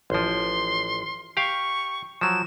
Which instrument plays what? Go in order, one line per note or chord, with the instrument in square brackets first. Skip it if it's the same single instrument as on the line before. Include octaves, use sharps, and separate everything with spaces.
[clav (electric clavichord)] A1 F3 [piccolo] C6
[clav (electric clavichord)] G4 F5 [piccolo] C#6
[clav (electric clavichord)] F3 F#3 [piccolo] E7